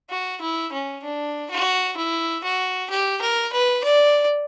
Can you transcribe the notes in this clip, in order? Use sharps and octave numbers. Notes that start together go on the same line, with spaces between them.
F#4
E4
C#4
D4
F#4
E4
F#4
G4
A#4
B4
D5